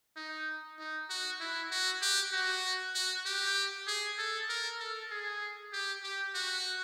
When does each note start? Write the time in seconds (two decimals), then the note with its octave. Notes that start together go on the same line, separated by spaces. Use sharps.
0.16 D#4
0.79 D#4
1.09 F#4
1.40 E4
1.71 F#4
2.02 G4
2.33 F#4
2.95 F#4
3.25 G4
3.87 G#4
4.18 A4
4.49 A#4
4.80 A4
5.11 G#4
5.73 G4
6.04 G4
6.34 F#4